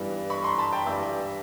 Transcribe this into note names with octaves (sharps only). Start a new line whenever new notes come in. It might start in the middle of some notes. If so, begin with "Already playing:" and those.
Already playing: G2 E3 G3 B3 D4
B5 C#6
A#5 C6
A5 B5
G5 A5
G2 E3 G3 D5 E5